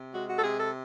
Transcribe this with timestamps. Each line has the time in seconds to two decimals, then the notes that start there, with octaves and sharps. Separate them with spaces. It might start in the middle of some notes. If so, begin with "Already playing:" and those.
Already playing: C3
0.12 G#3 F#4
0.27 F#4
0.38 A4
0.42 C3 G#4
0.57 A4